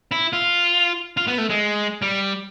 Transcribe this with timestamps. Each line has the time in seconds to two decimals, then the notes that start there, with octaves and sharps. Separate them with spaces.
0.11 E4
0.33 F4
1.17 F4
1.27 B3
1.38 A3
1.49 G#3
2.02 G3